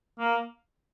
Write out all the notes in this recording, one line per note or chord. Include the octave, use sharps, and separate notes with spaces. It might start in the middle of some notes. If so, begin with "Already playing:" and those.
A#3